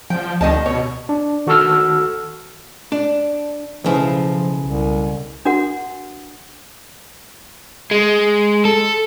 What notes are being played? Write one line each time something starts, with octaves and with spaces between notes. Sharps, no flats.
F3 G5
D2 D#3 D#5 A5
B2 C#5
D4
D#3 F#4 A4 A5 E6 F6
D4
B1 C#3 F3 E4
C2
D4 F#4 A#4 F#5
G#3
A4